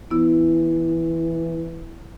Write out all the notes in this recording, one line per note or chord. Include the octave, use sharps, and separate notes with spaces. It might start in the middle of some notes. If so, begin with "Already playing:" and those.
E3 B3 E4